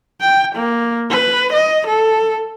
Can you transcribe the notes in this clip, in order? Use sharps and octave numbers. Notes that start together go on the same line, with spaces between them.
G5
A#3
B4
D#5
A4